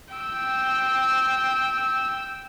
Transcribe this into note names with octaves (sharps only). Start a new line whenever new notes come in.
G5 E6